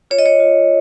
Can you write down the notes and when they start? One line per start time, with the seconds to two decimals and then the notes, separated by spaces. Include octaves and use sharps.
0.11 F4 C#5
0.19 D#5
0.26 C#5
0.40 F4